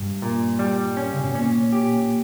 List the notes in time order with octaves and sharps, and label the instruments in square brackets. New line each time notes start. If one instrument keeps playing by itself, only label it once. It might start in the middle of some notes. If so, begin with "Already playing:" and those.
Already playing: [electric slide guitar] G2
[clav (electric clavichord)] A#2
G3
C#4
[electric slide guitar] C#3
B2
[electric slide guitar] A#2 [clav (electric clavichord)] C#4
[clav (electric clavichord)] G4